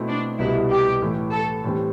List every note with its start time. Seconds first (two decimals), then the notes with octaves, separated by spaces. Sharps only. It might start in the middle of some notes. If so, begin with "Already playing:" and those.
Already playing: B2 A3 C4 E4
0.08 D4
0.39 C2 B2 G3 B3 E4
0.71 G4
1.02 A2 E3 A3
1.33 A4
1.64 A2 E3 G3 C4